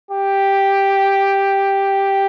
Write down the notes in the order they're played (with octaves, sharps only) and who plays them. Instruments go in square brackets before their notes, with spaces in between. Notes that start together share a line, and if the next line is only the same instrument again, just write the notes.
[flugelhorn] G4